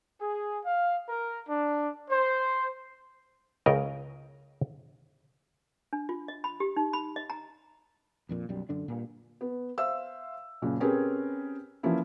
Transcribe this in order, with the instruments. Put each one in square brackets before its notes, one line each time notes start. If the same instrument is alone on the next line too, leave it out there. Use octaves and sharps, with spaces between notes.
[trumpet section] G#4
F5
A#4
D4
C5
[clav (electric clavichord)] C#2 C#3 A#4 D#5 G5
[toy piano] D4
F4
D#5
B5
G4
D#4
B5
D#5
A#5
[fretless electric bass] A#1 F2 A#2
B1 F#2 G3
F#2 D3 D4
G2 A#2
[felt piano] B3
C5 E5 F5 E6
F#1 A#2 C#3
C4 C#4 G4 G#4 A#4 B4
E3 F3 A#3 C#4 E4